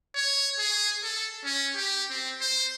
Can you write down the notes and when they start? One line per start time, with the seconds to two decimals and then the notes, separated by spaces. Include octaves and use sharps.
0.16 C#5
0.59 G#4
1.04 A4
1.45 C#4
1.76 G4
2.10 C4
2.41 C5